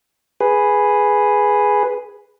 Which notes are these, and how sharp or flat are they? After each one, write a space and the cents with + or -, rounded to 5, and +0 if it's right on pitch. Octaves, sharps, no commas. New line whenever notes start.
G#4 +0 B4 +0